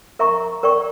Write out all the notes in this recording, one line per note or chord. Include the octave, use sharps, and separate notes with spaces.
A#4 E5 A#5 C#6
A#4 D5 G5 C#6